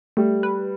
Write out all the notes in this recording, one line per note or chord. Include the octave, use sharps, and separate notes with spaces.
G3 A3
B4